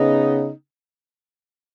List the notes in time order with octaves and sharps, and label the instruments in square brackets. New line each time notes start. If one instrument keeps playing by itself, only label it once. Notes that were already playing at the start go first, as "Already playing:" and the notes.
Already playing: [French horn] C#3 [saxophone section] B3 D#4